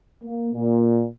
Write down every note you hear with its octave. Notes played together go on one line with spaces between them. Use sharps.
A#3
A#2